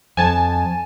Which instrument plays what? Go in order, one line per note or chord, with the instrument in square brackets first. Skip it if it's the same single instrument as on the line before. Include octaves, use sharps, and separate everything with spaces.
[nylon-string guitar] F2 [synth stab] G#5 A5